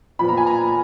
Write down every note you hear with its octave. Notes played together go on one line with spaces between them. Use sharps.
A#2 F3 B3 B5
A#5
G#5
A#5